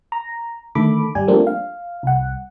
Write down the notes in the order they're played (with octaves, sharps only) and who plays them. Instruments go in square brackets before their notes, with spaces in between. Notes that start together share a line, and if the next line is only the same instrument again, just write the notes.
[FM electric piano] A#5
D3 D#3 A3 A4 B5 D6
G1 G3 G4 G#5
F3 G3 A3 A#3 C4 D4
F5
C2 F#5